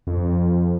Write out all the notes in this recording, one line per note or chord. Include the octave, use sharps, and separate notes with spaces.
F2